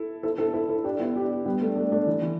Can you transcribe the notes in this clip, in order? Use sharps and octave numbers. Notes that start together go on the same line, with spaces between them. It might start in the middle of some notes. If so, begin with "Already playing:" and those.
Already playing: E4 A4
E4 A4
E4 A4
E4 A4
E4 A4
D4 G4
B3 E4
D4 G4
G3 B3
A3 D4
A3 D4
A3 D4
E3
E3